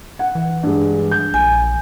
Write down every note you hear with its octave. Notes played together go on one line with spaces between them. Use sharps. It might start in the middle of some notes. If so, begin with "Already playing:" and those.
F#5
E3
G2 G#3
G6
A#1 G#5